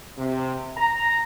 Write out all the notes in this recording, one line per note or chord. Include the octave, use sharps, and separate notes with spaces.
C3
A#5